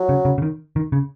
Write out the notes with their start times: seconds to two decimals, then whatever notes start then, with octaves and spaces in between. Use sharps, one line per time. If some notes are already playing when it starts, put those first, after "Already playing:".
Already playing: F#3
0.09 C#3
0.25 C#3
0.38 C#3
0.42 D#3
0.76 D#3
0.92 C#3